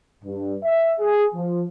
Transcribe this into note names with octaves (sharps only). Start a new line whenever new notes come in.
G2
E5
G#4
F3